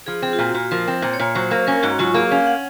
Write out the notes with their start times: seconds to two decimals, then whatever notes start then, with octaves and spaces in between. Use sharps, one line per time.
0.06 F3 G#4
0.22 C4 G#4
0.33 F4
0.39 A#2 F#4
0.54 A#2 F#4
0.71 F3 A#4
0.88 C4 C5
1.02 A#2
1.14 C#5
1.20 A#2
1.35 F#3 C5
1.51 A#3 C5
1.67 C#4 A#4
1.83 G#2 F#4
1.99 F#3 F4
2.14 A#3 G#4
2.31 C#4 F5
2.47 F#5